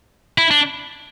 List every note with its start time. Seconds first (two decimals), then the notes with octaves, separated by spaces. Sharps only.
0.38 E4
0.51 D4